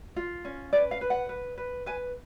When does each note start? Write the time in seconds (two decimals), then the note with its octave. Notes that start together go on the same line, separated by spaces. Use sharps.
0.16 F4
0.45 C#4
0.73 B4 D5
0.91 F5
1.01 B4
1.10 F#5
1.29 B4
1.57 B4
1.86 B4 G#5